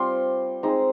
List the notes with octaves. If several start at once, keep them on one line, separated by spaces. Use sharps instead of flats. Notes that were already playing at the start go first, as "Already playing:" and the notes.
Already playing: G3 C4 F4 C6
G#3 C4 D#4 A#5